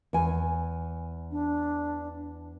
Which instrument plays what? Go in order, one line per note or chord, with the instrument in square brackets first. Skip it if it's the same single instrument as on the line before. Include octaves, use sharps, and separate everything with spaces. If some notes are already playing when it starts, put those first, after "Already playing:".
[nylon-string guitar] E2 G#5
[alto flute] D4